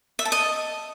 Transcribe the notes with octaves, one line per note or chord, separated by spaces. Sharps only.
E5
A5
D#5